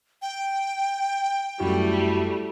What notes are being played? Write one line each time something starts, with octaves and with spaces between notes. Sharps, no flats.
G5
F#2 G3 A3 E4 F#4